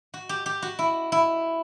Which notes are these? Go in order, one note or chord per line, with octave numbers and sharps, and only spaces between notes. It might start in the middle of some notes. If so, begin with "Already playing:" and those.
F#4
G4
G4
F#4
E4
E4